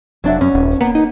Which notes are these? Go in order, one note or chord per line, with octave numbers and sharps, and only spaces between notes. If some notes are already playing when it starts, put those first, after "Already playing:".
F1 F#3 D4 E5
F#2 C#4
D#1
A#3 B3
D#4